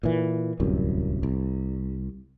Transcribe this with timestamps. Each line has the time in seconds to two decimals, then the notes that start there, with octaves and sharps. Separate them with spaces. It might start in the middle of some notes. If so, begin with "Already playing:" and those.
0.03 A#2 E3
0.60 D1 C2 F#2
1.23 C2